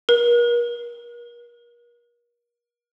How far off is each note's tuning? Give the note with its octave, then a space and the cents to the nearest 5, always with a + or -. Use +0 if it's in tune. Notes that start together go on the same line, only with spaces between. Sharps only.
A#4 +40